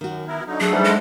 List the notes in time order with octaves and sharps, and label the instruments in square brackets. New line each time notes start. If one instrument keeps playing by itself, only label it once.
[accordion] F#2 [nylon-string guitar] D#3 F#4
[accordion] B3 E4 A#4
D3 F#3 D#4
[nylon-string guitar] F#3 D4 [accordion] A3 A4 F#5 [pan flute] G#4
[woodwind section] G#2 E3 G3
[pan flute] G#3